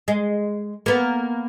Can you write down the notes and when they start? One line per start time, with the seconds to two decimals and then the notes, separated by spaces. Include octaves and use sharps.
0.08 G#3
0.86 A#3 B3